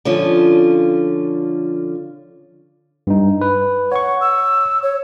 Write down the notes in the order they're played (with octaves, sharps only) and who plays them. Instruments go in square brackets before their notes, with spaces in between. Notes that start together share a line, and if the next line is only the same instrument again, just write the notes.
[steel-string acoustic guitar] D3 F3 C#4 F4
[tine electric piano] G2 D#4
B4
[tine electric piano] C#5 C#6 [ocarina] F#5
[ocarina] E6
C#5